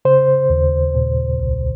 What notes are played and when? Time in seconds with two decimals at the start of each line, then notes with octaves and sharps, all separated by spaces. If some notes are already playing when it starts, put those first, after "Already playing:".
0.05 C#3 C5
0.50 D#2
0.95 A#2
1.39 C2